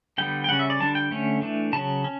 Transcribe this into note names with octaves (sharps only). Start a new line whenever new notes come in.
D3 G3 B3 G5
G5
C#3 G3 C#4 F#5
E5
D5
D3 G3 D4 A5
G5
D3 A3 C#4
E3 A3 D4
C#3 F#3 C#4 A5
C#4